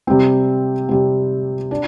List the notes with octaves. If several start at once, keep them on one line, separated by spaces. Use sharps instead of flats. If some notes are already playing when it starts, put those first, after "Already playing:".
C3 G3 C4
C3 G3 C4
D4